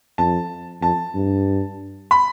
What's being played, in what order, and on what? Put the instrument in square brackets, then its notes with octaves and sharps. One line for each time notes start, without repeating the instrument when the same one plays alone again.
[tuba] F2 [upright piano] A5
[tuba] F2 [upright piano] A5
[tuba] G2
[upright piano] B5